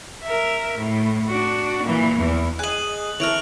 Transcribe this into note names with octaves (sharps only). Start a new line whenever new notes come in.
A#4 E5
A2
D4 F#4
A#2 E3
E2 E3
G#4 D#5 F#6 F#7
E3 E4 A4 A#4 C#5 F6 D7 F7